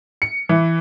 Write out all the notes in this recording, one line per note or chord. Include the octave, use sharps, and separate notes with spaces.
C#7
E3